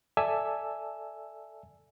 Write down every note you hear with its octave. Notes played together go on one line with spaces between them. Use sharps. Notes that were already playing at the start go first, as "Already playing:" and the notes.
A4 D5 E5 G#5 A5 E6